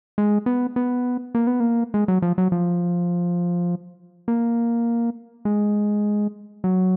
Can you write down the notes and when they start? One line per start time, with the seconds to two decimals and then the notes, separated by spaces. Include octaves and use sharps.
0.18 G#3
0.46 B3
0.76 B3
1.35 A#3
1.47 B3
1.60 A#3
1.94 G#3
2.08 F#3
2.22 F3
2.38 F#3
2.52 F3
4.28 A#3
5.45 G#3
6.64 F#3